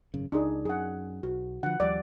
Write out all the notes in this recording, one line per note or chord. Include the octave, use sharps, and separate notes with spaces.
G#1 F#2 C#3
C#2 D4 D#4 G#4
F#2 G#4 F#5
B1 F#4
D3 F3 F#5
D#2 F3 G3 D5